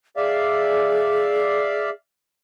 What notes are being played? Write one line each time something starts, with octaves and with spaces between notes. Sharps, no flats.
G#4 D5 E5 F5